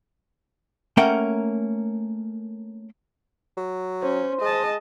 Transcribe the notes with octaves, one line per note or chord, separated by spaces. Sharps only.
A3 A#3 C#4 A#4 F#5 G5
F#3
C#4 C5
G#3 D#5 A5